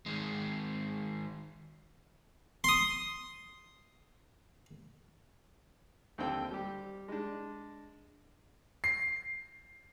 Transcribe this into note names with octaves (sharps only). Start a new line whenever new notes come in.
D#3 G#3
C6 D#6
D#2 D3 C4 A4 G5 E6
G3 G4
G#3 D4
C7